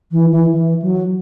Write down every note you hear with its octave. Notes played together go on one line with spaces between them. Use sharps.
E3
E3
E3
F#3